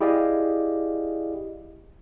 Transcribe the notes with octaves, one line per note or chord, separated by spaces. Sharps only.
E4 G4 G#4 D5 D#5 F5